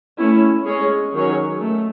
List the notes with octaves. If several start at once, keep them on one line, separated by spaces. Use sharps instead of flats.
A3 C#4 E4
G#3 C#4 G#4 C#5
D#3 F#3 C#4 G#4 C#5
A3